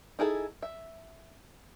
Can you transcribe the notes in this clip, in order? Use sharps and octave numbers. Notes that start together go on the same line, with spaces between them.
D#4 E4 G#4 A4
E5